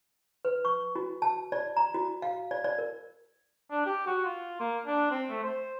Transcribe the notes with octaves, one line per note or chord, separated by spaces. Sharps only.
B4
C#6
F#4
A5
D5
A#5
F#4
F5
D5
D5
A#4
D4
G4
F#4
F4
A#3
D4
C4
A3
C5